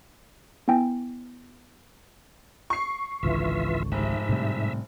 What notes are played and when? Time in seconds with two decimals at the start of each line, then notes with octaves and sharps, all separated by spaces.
0.68 B3 E4 G5 G#5
2.70 C#6 C7
3.23 G#1 C#2 D3 E3 F4 E5
3.92 F1 G#2 E5
4.29 A2 C3 G3